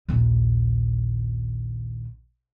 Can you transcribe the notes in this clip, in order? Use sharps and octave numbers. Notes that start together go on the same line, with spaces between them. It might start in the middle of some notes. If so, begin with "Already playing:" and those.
A#1 D#2